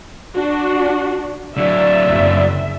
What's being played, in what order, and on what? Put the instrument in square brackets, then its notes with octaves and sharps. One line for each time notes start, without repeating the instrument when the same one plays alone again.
[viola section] D4 F#4
[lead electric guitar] D3 F#3 [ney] D5 [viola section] E5
[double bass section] F#1